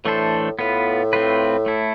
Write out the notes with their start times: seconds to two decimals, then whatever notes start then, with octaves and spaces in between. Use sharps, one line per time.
0.04 A2 E3 A3 D4 A4 C5
0.59 A2 B3 F4 B4
1.13 A3 C4 F4 B4
1.66 A3 E4 A4